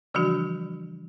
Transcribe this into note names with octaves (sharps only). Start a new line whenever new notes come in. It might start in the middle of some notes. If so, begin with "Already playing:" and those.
C#3 E3 F3 G3 D4 F#4